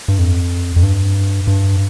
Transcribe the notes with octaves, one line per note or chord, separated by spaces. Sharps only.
G2
F2
F2
G2
G2